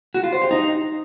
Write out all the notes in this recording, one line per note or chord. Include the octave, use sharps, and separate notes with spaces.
F#4
F4
C5
G4
D#4